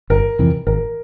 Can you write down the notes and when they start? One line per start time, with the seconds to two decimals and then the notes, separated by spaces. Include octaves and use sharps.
0.10 G1 A#4
0.39 F2 C3 E3
0.67 G#1 A#4